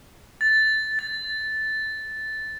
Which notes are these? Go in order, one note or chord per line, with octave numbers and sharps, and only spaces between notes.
A6
A6